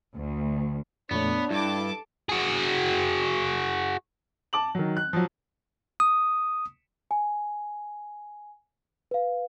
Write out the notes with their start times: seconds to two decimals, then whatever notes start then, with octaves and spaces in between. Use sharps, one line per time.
0.15 D2
1.11 F2 A#2 A3 B3 D4 C#5
1.51 G2 E4 A4 A5 D6
2.29 F#4 G#4
4.53 A5 D6 F#7
4.75 D#3 F#3
4.97 F#6
5.13 F3 F#3
6.00 D#6
7.11 G#5
9.11 B4 F5